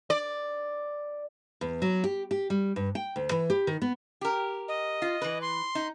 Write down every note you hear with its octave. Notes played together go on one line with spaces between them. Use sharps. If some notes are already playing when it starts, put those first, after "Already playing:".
D5
E2
F#3
G4
G4
G3
G2
G5
D2
E3
G4
D#3
B3
G4 A#4
D#5
F4
E3 B4
C6
D#4